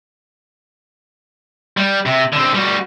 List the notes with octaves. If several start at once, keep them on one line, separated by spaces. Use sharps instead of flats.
G3
C3
D3 C4
G3 F#4